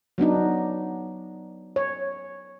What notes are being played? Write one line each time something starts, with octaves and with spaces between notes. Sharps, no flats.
F#3 B3 D4 D#4
C#5